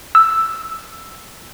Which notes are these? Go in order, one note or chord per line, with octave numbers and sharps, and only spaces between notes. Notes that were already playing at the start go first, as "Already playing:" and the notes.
E6